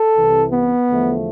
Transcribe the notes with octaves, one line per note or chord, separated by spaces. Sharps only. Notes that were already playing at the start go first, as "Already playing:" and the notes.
Already playing: A4
C2 C3 E3
B3
E2 D3 F3 A3